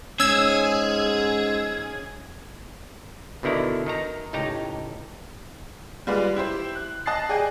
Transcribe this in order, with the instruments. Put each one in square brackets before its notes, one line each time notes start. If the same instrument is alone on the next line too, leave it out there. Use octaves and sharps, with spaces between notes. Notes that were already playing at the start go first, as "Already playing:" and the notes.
[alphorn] G#2 [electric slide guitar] C#4 [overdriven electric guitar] G#4 [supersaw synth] E6 G#6
[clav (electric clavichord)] B2 D3 D#3 E4 A#5
D#3 D#4 A#5
C#2 A2 D#4 G4 A#5
[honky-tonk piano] G3 G#3 F4 B4 D5
E4 G4 C5
F#6
D#5 A5 D#6 F#6 A6 C7
G#4 D5 D#5 G5 G#5